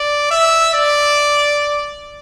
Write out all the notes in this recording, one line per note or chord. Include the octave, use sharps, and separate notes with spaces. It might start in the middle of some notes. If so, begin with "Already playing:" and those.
Already playing: D5
E5
D5